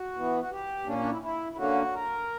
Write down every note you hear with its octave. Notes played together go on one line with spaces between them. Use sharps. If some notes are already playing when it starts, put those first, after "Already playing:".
Already playing: F#4
E3 B3
F#4
G4
A#2 A#3 C#4 D4
D4
E4
E4
E4
D3 A#3 C#4 F#4
A#4